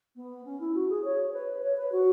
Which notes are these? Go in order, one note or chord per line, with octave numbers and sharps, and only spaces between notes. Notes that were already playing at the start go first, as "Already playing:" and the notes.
B3
C#4
E4
F#4
G#4
C#5
B4
C#5
B4
F#4